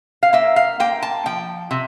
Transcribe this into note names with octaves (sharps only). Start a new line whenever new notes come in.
F5
A#3 E5
F5
A#3 G5
A5
F3 G5
C3